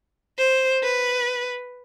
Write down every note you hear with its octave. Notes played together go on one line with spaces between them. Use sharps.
C5
B4